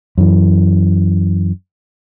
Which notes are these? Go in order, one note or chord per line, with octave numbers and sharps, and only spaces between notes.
F#2 E3